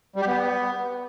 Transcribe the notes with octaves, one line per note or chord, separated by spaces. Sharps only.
G3
G4
B3